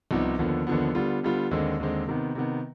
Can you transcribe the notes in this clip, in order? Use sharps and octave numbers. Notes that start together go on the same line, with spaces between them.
C2 C3 F3 B3 D#4
D#2 D3 F3 B3
D#2 D3 F3 B3
D3 G3 B3 F4
D3 G3 B3 F4
D#2 D3 G#3 C4
D#2 D3 G#3 C4
C3 D#3 B3
C3 D#3 B3